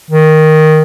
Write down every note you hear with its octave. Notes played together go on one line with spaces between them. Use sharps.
D#3